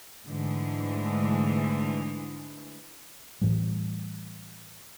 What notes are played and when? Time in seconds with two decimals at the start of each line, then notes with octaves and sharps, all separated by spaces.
0.27 G#2 D3 E3 G#3 A3
3.42 A2 E3 G3